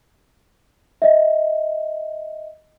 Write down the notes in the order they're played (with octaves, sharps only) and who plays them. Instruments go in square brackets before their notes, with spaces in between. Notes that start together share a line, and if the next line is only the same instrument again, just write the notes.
[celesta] D#5 E5